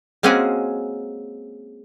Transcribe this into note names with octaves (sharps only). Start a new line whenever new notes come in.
G#3 A#3 C4 C#4 F#4 G#4